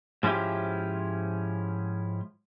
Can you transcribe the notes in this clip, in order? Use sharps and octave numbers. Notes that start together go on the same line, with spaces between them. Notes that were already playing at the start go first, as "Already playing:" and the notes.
G#2 F3 C#4 E4 F4 G4